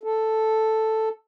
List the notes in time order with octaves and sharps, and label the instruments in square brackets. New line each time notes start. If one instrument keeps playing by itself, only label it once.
[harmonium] A4